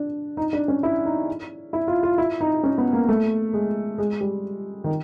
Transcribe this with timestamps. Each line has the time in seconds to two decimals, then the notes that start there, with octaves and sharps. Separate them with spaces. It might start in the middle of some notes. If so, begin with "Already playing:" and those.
Already playing: D4
0.37 D#4
0.53 D4
0.68 C#4
0.83 E4
1.06 D#4
1.73 E4
1.88 F4
2.03 F4
2.18 E4
2.41 D#4
2.63 C#4
2.78 B3
2.93 A#3
3.09 A3
3.54 G#3
3.98 G#3
4.21 G3
4.84 D#3